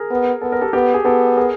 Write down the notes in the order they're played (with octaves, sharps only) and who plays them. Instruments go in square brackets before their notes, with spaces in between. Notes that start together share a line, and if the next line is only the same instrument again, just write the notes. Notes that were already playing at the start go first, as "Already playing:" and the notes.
Already playing: [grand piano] G#4 A#4
[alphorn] B3
[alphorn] B3 [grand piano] A4
[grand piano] A#4
G4 A4
[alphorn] B3 [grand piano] G4 A4
[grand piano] G#4
[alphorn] B3 [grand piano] G4 A4
[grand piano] G#4 A#4